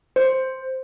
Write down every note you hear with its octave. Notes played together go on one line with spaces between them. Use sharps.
C5